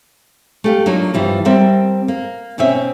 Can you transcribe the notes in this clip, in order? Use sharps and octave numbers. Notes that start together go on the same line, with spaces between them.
A3 G4 F5
F#3 A#3 D4 D#4 F4
G2 E3 F3 G3
G3 C4 A#4 E5 F#5
A#3
B2 C4 C#4 E5